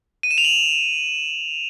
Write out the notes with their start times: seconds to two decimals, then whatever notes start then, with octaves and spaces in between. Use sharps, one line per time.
0.23 D#7
0.31 E7
0.38 F7
0.44 F#7